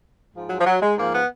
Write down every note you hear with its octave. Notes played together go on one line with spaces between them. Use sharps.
G#2 F3
F#3
F3
F#3
G#3
G#2 F3 A#3
B3